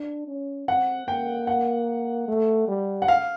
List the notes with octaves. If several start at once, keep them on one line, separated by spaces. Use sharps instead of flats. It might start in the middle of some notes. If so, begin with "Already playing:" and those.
Already playing: D4
C#4
C4 F#5
A#3 G5
F#5
A3
G3
F#5
F5